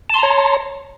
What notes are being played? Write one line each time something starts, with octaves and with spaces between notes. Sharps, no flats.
C#5 A5 A#5 C6